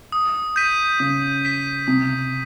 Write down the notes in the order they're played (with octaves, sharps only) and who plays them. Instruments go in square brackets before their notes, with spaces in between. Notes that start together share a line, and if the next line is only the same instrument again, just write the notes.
[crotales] D#6
G6 B6 D#7
[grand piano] C#3 [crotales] D#6
[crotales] G6 B6 D#7
[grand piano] C3 [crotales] D#6